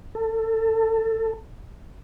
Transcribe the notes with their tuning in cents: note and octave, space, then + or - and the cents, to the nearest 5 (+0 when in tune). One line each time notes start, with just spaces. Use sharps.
A4 +25